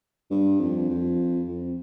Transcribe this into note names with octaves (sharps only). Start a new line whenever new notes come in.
G2
F2
F2
F2